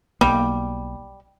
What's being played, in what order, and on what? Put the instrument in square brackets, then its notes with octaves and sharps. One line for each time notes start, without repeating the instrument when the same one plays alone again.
[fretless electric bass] B1 A#3 [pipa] G3